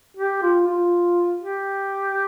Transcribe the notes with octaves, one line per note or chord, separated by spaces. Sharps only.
G4
F4
F4
G4